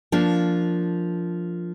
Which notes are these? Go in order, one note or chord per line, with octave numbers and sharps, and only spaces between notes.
F3 A#3 D4